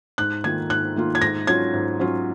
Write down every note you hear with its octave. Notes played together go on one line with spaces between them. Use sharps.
G#2 F#6
D#3 A#3 F4 G#6
G#2 F#6
D#3 A#3 F4
G#6
G#2 A#6
F#3 C#4 F4 G#6
G#2
F#3 C#4 F4